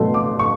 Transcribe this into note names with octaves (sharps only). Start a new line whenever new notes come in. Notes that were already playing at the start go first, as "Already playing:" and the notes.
Already playing: B2 F#3 A3 C6
D6
C#6